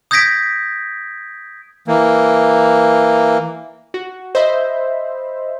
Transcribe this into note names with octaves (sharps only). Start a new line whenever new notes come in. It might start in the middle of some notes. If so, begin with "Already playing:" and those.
D#6 G6 G#6 A#6 B6 D7
E3 A#3
F#4
C5 D#5 E5 B5